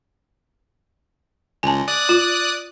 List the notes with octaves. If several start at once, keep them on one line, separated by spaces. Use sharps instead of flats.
C#2 G#5 A5
D5 D#6 F#6
F4